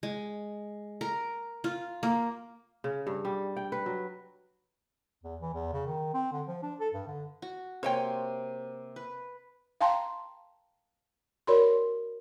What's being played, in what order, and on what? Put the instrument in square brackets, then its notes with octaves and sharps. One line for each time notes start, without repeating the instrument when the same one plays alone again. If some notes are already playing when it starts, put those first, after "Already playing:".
[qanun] G#3
A#4
F4
A#3
[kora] C#3
G2
G3
G5
B4
F#3
[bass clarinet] E2
E3
E2
C#3
D#3
C4
D3
F3
D4
A4
G2
D3
[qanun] F#4
[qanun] C3 A#3 [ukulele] C5 C#5 G5
[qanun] B4
[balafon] F5 G5 A5 A#5 C6
F#4 A#4 C#5 D5 B5 C6